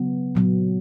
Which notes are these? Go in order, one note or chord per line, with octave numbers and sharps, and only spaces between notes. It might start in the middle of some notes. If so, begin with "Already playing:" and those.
Already playing: C#3 F#3 B3
A#2 F#3 B3